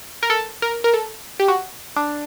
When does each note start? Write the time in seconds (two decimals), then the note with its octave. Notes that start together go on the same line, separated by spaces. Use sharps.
0.23 A#4
0.30 A4
0.62 A#4
0.84 A#4
0.93 A4
1.40 G4
1.48 F#4
1.96 D4